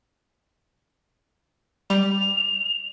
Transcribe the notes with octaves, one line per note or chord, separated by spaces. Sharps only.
G3 F7